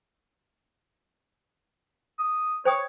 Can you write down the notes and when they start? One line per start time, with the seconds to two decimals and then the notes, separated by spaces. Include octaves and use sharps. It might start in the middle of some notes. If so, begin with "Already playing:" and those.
2.19 D#6
2.65 C5 C#5 G5 D#6